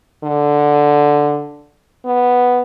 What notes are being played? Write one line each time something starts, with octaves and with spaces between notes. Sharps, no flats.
D3
B3